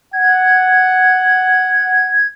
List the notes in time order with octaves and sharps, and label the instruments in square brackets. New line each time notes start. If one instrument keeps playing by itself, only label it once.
[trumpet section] F#5 [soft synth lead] G#6